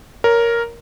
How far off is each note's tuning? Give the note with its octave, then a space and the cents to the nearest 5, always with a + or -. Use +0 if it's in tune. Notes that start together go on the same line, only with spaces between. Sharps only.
A#4 +0 C#5 +15